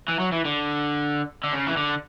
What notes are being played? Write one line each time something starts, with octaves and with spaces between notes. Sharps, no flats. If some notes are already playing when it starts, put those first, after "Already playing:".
E3
F#3
E3
D3
D3
C#3
E3
D3